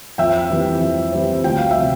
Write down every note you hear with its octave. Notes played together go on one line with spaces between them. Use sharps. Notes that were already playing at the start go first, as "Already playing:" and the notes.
F2 E5 G5
E3 G3 C4
F2
E3 G3 C4
D2 G5
F5
E5
C3 F3